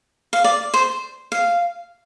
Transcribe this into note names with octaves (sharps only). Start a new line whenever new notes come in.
F5
D5
C5
F5